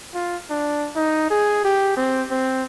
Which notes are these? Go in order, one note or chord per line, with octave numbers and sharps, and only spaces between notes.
F4
D4
D#4
G#4
G4
C4
C4